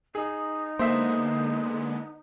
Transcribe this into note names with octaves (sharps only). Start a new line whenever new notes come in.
D#4 G#4
D3 G#3 A#3 B3 C5 E5